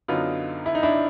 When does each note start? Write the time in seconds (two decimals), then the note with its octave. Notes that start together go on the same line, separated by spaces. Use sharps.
0.08 F#2 D3 F#3 B3 D#4 F4
0.66 E4
0.75 D#4
0.83 D4 E4